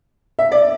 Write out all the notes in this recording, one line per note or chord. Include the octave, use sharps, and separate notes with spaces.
E5
D5